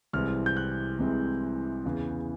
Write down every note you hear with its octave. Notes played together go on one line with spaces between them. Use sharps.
C2 C3 E3 G#3 C4 F6
G6
F#6
C2 C3 E3 G#3 C4
E2 C#3 E3